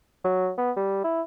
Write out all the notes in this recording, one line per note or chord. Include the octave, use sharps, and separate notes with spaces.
F#3
B3
G3
E4